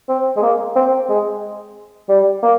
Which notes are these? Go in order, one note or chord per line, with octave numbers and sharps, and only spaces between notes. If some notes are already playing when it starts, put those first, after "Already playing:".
C4
G#3
A#3
C4
G#3
G3
A#3